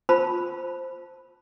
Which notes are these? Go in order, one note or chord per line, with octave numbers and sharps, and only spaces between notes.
F4 C5 A5 B5